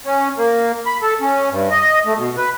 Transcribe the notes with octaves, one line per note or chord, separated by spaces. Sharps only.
C#4
A#3
B5
A4
C#4
G2
D#5
A3
B2
B4